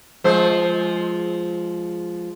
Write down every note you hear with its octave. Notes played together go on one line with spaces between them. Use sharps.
F3 G#3 C5